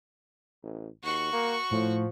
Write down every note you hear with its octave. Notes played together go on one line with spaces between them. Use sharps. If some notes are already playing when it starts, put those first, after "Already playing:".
A1
D#2 F#4 C#6
A#3
A2 F3